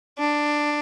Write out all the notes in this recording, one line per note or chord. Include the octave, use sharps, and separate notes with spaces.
D4